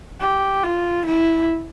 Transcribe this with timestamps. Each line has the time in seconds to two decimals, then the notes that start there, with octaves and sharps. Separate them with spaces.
0.21 G4
0.63 F4
1.05 E4